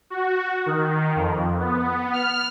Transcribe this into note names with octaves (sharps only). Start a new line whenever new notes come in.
F#4
D#3
F2
B3
F6